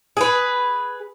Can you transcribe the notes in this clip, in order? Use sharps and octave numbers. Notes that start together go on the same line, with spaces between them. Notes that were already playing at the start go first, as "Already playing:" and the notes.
G#4 B4